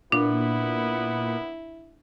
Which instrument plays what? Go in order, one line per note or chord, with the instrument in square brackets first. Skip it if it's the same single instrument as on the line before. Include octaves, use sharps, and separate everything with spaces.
[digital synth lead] A#2 [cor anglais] B3 [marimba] D4 [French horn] E4